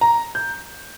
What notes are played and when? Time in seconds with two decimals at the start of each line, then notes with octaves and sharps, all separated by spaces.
0.01 A#5
0.35 G6